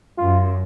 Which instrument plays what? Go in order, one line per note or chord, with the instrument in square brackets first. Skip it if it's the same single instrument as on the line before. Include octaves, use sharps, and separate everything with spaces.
[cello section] F#2 [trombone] F4